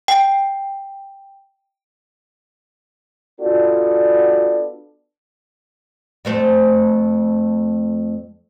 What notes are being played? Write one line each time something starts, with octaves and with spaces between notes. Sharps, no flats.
G5
B3 D4 F4 F#4 A4 D5
F2 A3 C5